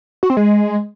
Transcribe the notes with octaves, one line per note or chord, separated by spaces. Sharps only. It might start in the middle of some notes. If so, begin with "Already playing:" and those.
F#4
C4
G#3